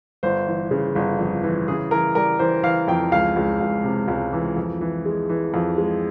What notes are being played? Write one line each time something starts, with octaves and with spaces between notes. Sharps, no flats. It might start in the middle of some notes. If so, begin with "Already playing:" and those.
G1 C5
E3
C#3
G1
F2
E3
C#3 G#4
E3 A#4
G3 A#4
E3 C5
E3 F5
F2 G5
C#2 F5
C#2
C#2
C3
C#2
E3
F2
E3
G#3
E3
F2
G#3